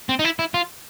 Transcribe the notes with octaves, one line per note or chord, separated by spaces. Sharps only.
C4
D#4
E4
E4
F4